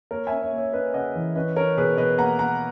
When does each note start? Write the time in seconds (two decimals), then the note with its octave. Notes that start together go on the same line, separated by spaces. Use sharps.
0.11 A#3 A#4 C#5
0.27 C#4 E5 G#5
0.42 C#5 E5
0.53 A#3
0.58 C#5 E5
0.73 C#4 B4 D#5
0.94 C#3 D#5 F#5
1.15 E3
1.36 C#4 B4 D#5
1.56 C#4 A#4 C#5
1.77 B2 G#4 B4
1.97 B2 B4 D#5
2.18 A#3 F#5 A#5
2.39 A#3 F#5 A#5